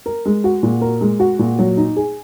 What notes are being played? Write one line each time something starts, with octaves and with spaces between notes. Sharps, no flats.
A#4
G#3
F#4
A#2
A#4
G#3
F#4
A#2
F#3
D#4
G#4